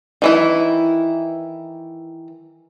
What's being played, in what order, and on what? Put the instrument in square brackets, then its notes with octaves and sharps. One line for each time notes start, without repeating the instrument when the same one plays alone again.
[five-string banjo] D#3 E3 E4